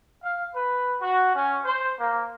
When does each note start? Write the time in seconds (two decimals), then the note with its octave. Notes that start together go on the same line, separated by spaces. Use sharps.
0.23 F5
0.54 B4
1.00 F#4
1.34 C#4
1.64 C5
1.99 A#3